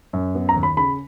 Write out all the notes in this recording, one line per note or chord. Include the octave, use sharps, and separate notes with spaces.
F#2
B3
A#5
D#2
B5
C#3 B5